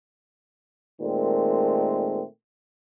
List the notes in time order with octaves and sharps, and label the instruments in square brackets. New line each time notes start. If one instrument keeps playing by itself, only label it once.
[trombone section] A#2 D#3 G#3 A3 C4